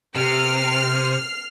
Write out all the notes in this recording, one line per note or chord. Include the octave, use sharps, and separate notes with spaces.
C3 F6 C7